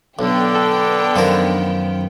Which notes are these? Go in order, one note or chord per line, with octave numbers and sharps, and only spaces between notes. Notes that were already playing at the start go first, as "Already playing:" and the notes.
B1 D3 B3 G5
A4
F#2 D#3 F3 A#4